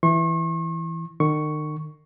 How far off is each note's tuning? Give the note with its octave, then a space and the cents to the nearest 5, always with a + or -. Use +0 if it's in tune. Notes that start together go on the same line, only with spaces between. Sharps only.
E3 +0 C#6 -45
D#3 -40 C#6 +0